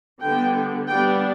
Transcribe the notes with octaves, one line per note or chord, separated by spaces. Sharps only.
D3 G3 B3 G5
G3 B3 D4 G5